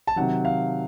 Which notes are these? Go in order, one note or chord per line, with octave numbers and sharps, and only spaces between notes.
A5
C3 D#3 F#3 F#5
F5